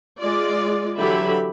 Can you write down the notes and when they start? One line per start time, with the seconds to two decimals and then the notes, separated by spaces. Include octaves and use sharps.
0.19 G#3 F4 D5
0.99 D3 E3 F#3 G4 E5 B5